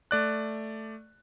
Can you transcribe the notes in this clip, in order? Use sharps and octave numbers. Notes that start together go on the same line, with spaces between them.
A3 D5 F#6